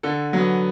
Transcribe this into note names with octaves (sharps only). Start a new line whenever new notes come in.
D3 A4
F#3 B3